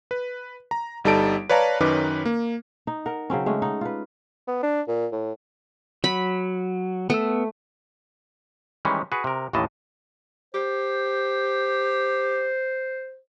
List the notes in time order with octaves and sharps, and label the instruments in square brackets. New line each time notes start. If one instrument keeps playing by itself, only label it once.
[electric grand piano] B4
A#5
G1 G3 D#4 A4 A5 D7
B4 C#5 D5 F5 A5 A#5
F#2 D#3 C#4 D#4 B4 D6
A#3
[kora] D#4
A#4 F#5
C#3 F#3 C4 C#4
G#3 A3 C#4
D#4 F#5
F4 B4
[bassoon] B3
D4
A#2
A2
[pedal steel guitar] F#3 [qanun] B5
[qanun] A3 [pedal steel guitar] B3 E6
[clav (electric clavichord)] D#3 E3 G3 G#3 C#4
F#4 G#4 B4
C3 A#4
A1 D#2 A2 E3 D#5 A5
[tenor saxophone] G4 [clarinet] C5